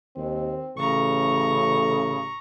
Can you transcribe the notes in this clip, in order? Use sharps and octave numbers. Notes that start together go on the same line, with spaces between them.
D#2 C4
A1 C#3 A4 A#5 C#6